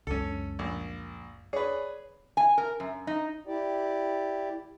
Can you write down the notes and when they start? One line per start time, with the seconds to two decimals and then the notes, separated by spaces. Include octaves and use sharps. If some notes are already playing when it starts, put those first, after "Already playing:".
0.07 C#2 F#2 C#4 A4
0.59 A#1
1.53 G#4 B4 C#5 D5
2.37 G#5
2.58 A#4
2.80 F#2
3.07 D#4
3.47 E4 G4 D5